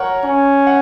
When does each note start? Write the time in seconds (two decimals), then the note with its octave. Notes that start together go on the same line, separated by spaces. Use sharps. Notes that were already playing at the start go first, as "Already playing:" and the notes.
Already playing: A#4 C#5 F#5
0.24 C#4
0.67 F#5